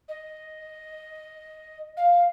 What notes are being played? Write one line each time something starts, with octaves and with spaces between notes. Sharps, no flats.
D#5
F5